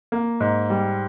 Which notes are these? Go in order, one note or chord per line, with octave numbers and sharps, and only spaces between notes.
A#3
G#2
G3